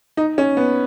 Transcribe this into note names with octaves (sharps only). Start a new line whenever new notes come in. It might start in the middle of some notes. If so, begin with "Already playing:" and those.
D#4
C#4
B3